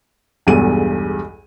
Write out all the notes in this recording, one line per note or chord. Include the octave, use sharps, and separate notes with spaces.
B1 E2 G2 G#3 A4 D#7